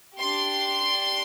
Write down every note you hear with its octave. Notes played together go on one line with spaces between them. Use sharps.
D4 G4 C6